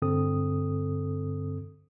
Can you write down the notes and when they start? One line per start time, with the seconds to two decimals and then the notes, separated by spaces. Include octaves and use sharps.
0.02 G2 D3 C4 A4 D#6